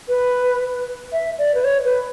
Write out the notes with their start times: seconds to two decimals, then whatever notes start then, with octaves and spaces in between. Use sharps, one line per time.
0.09 B4
1.12 E5
1.39 D5
1.55 B4
1.64 C#5
1.85 B4